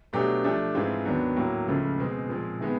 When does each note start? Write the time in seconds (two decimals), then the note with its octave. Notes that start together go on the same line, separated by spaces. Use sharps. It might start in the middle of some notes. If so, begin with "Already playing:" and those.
0.13 B2 F#3 A3 D4 G4
0.44 F3 A3 D4 G4
0.74 G#2 E3 G#3 C4 F4
1.05 D#2 D#3 F#3 B3 D4
1.36 A2 F#3 A#3
1.68 C#2 C#3 F3 A3
1.98 B2 G#3 C4
2.28 A#2 F3 G#3 C4
2.59 C3 D#3 G#3 B3